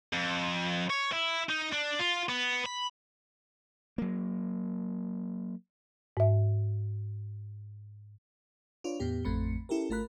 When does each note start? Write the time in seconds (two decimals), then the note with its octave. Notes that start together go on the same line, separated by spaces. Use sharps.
0.13 F2
0.90 C#5
1.13 E4
1.50 D#4
1.73 D4
1.99 F4
2.29 B3
2.66 B5
3.98 F#3 A#3
6.17 G#2 E5
8.84 D4 F4 B4 C#5 D5
9.00 E2 A2 B3 G4
9.25 A1 F2 A3 C4 B5 C#7
9.69 C#4 E4 G4 A4 A#4
9.90 G#1 A3 F4 A#4 B5 F#6